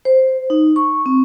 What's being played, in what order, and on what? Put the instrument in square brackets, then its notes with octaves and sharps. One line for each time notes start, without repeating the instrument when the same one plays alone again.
[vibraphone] C5
D#4
C#6
C4